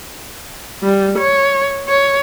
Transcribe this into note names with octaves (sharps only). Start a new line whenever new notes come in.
G3
C#5
C#5